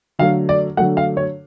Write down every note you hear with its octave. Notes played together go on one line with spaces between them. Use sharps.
D3 F#3 A3 F5
D5
D3 F#3 A3 F#5
F5
C#5